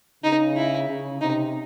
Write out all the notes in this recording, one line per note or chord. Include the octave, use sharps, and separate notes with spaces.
C#3 D#4
E4
C#3
C3 D#4